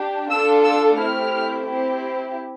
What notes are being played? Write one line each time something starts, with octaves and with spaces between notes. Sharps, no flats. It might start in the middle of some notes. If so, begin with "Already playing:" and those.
Already playing: D4 G4
D4 F4 A4 E6
E6
A3 C4 E4 G4 F6
C4 E4 G4